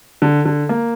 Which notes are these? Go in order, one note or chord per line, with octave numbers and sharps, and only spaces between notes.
D3
D3
A#3